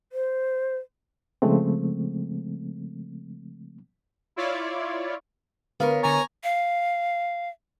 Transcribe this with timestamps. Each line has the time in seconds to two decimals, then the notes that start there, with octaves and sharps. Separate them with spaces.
0.12 C5
1.42 C#3 F3 G#3 A3 C4
4.36 E4 F4 C#5 D5
5.80 D3 B3 A#4 B4 C#5 F5
6.03 D3 G#5 A#5 C#6 A6
6.44 F5